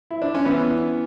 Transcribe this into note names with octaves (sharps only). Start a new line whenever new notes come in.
E4
D4
C#4
E3 B3